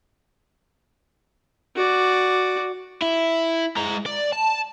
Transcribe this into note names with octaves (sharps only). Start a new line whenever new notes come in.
F#4 D5
E4
G#3 A#5
D5
A5